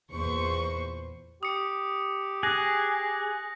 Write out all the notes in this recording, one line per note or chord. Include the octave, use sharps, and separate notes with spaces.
E2 A#2 B4 C5 C#6
G4 D#6 C#7
G#4 F#6 A#6